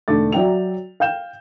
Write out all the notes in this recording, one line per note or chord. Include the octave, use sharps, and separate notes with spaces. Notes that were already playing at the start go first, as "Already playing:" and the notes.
E1 D3 A3 D#4 D6 A6
F#3 D5 E5 G5 A#5 F7
F5 G5 G6 E7